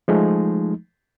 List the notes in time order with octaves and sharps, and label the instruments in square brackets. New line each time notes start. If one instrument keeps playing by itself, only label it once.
[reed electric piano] F3 G#3 A3 D#4